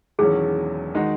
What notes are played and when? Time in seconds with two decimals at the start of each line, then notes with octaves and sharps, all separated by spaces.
0.19 E1 E2 D#3 F#3 C#4 G#4
0.95 D#3 G#3 D#4 F#4